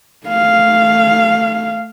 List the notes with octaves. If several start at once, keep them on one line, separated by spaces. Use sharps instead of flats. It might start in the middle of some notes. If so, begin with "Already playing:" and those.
A3 F5